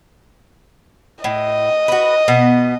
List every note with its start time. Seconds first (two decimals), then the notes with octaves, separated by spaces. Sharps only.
1.24 A2 D#5
1.88 F#4 B4
2.28 B2 B3